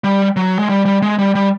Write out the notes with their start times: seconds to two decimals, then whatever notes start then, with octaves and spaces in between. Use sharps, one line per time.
0.04 G3
0.36 F#3
0.59 G#3
0.69 G3
0.85 G3
1.02 G#3
1.19 G3
1.35 G3